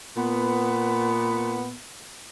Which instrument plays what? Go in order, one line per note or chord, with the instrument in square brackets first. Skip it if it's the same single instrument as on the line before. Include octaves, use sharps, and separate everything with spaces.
[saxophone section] A#2 B3